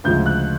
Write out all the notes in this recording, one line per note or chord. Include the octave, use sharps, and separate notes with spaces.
D2 C#3 F3 G#3 G6
F#6